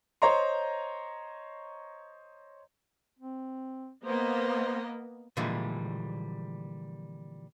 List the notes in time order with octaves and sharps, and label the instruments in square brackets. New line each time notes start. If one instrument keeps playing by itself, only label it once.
[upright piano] C5 C#5 D#5 A#5 C6
[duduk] C4
[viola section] A#3 B3 D#5 [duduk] C5
[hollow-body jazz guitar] A#2 D3 E3 F3 G3 G#3